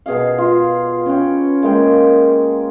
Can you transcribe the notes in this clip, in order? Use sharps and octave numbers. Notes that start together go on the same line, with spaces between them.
B2 G#4 D#5 F5
F4
C#4 B4 C#5 G5
G#3 A#3 G#4 G5